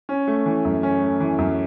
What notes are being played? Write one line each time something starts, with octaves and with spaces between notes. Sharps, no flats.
C#4
A3
E3
F#2
C#4
A3
E3
F#2